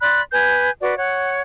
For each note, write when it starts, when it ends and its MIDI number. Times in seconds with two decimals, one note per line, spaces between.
0.01 0.20 74
0.01 0.20 83
0.01 0.20 84
0.01 0.20 90
0.32 0.69 71
0.32 0.69 80
0.32 0.69 91
0.81 0.94 66
0.81 0.94 71
0.81 0.94 74
0.97 1.41 73
0.97 1.41 78